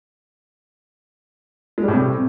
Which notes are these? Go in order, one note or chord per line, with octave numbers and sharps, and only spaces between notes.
G#3
G3
A2
C3